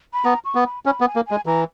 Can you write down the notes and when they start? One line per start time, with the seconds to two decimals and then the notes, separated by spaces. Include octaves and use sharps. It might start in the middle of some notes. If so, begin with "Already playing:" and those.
0.13 B5
0.25 B3 A#5
0.45 C#6
0.55 B3
0.65 B5
0.86 C#4 B5
1.01 B3
1.06 G#5
1.16 A#3
1.27 G#3 G#5
1.46 E3 A#5